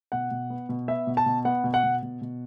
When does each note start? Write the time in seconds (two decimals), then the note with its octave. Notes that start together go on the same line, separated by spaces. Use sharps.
0.12 B2 F#5
0.31 B2
0.50 B3
0.69 B2
0.88 B3 E5
1.07 B2
1.17 A5
1.26 B2
1.45 B3 F#5
1.64 B2
1.74 F#5
1.83 B2
2.02 B2
2.21 B2